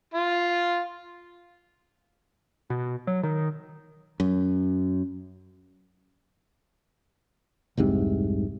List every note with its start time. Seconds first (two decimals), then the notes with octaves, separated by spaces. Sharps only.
0.14 F4
2.70 B2
3.07 F#3
3.23 D#3
4.20 F#2
7.77 F1 C2 G#2 C3